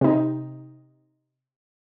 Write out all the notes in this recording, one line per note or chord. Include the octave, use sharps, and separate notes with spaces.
C3 D#4